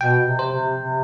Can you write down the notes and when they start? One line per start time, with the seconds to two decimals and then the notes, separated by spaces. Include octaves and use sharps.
0.01 B2 G5
0.26 C3
0.39 C5
0.51 C3
0.76 C3